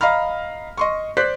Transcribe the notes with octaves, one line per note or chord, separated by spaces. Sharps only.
D#5 F5 A#5 B5 F6
D#5 C6 C#6
C5 D5 F#6 B6